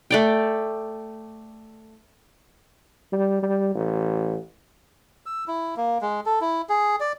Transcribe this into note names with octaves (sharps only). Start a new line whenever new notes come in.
A3 D5 G5
G3
G3
A1
E6
E4
A#3
G#3
A4
E4
G#4
D5